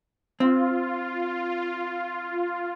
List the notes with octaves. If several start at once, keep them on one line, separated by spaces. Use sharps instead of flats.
C4 F4